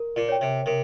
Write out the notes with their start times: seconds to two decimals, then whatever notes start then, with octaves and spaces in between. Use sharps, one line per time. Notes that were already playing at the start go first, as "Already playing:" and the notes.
Already playing: A#4
0.16 A#2
0.29 C#5 G5
0.41 C3
0.66 C3 A#4